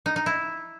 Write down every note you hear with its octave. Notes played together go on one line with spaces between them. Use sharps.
D#4
D#4
E4